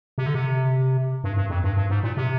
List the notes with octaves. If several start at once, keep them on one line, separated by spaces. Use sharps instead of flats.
C3
D3
C3
G2
G2
F2
G2
G2
G#2
A#2
C3